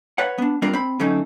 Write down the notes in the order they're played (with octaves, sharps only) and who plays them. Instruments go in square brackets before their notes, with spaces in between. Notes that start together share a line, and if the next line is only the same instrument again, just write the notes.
[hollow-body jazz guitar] B4 C#5 F#5
B3 D4
G3 C4 D4 F4 A#4 D5
C4 B5
D3 F#3 A3 C4 C#4 D#4